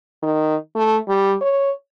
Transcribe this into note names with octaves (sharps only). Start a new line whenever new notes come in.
D#3
A3
G3
C#5